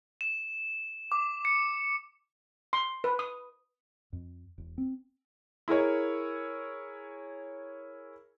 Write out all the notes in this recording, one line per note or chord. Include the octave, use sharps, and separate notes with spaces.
E7
D6
C#7
C6
B4
D#6
F2
E1
C4
E4 G#4 A#4 C#5